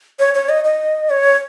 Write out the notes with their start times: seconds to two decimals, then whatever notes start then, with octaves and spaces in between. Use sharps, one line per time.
0.19 C#5
0.34 C#5
0.49 D#5
0.64 D#5
1.10 C#5